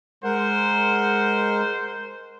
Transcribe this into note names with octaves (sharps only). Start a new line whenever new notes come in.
G#3 A#4 C5 F#5